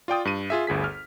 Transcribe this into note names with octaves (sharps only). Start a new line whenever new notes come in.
F4 D5 G5 D#6
G2 D#7
F4 G#4 E5
G1 D2 G#4 B6
F6